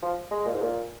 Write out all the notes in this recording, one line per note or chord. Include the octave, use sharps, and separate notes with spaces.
F3
G#3
A#2
G#2
A#2